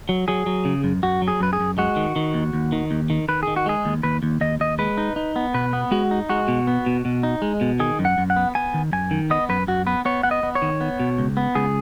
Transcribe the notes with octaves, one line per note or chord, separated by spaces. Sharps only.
F#3
F#3 G#4
F#3
C#3
F#2
F#2 F#4
F#3
G#4
F#2 B4
G#4
F#2
G#3 F#4
D#3
D#3
D#2
D#2
D#3
D#2
D#3
D#3 B4
D#3 G#4
F#4
G#3 G#4
D#2
D#2 B4
D#2
D#2 D#5
D#2 D#5
G#3 B4
D#4
D#4
B3
B2 B4
B3
G#3 F#4
D#4
G#3 F#4
B2
B3
B2
B2
D#4
G#3
B2
D#3 G#4
F#2
F#5
F#2
F#5
B3
B3 G#5
D#3
F#2 G#5
D#3
B3 D#5
F#2 B4
F#2 F#4
B3 B4
B3 C#5
B3 F#5
D#5
B3
C#5
D#3
B3
B2
C#2
B3
C#2 G#4